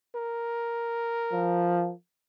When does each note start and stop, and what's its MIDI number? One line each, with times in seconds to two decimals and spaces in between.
0.15 1.92 70
1.33 1.92 53